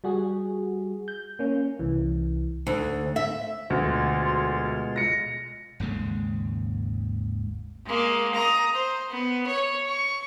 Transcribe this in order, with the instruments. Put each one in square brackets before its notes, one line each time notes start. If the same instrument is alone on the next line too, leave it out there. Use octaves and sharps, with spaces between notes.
[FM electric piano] G3 F#4 G#4
G6
A#3 C#4
C2 E3
[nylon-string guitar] D2
E5
[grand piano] D2 [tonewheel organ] B2 G#3 F4
[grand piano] A#6 C#7
[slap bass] G#1 D#2 C#3 G#3
[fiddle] G#3 A#3
A#5 D#6
C5
B3
C#5
C#6